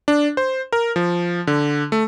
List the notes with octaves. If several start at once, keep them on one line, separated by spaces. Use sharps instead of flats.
D4
C5
A#4
F3
D3
A3